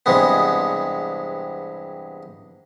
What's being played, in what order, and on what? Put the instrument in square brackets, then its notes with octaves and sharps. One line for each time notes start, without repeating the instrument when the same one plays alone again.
[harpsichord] E2 G2 C3 G#3 B3